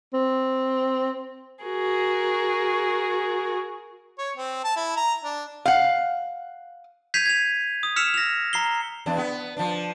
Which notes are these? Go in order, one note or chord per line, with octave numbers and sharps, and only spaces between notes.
C4
F#4 G#4 A#4
C#5
C4
A5
E4
A#5
D4
F5 F#5
G6 G#6 B6 C7 D#7 F7
G#6 F7
D#6
E6 F6 B6 C#7 E7 F7
A#6 F7
A#5 C7 G7
E2 D4
B3
F3 D4